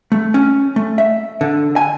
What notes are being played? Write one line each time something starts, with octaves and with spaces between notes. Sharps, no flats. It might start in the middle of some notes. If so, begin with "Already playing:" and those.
A3
C#4
A3
E5
D3
G#5